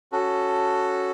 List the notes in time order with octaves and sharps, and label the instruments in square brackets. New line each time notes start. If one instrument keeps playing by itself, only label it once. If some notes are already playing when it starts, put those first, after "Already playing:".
[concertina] C#4 F#4 A4